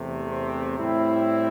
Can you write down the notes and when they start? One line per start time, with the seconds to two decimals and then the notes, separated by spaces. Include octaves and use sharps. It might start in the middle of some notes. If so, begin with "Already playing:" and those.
Already playing: E2 C3 A3
0.29 C4
0.78 A2 G3 C4 E4